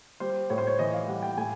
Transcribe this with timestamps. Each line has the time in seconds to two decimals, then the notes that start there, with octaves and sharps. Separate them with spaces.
0.20 G3 C5
0.50 A2 C#5
0.58 C5
0.67 C#5
0.79 E3 D#5
0.94 F5
1.08 G3 F#5
1.23 G5
1.37 A2 G#5